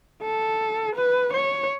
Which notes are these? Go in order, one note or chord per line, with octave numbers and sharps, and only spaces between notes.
A4
B4
C#5